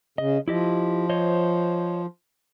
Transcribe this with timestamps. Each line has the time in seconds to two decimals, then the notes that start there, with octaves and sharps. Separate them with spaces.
0.18 C#3 D#5
0.48 F3 E4 G4 D#5
1.10 C5 C#5 D#5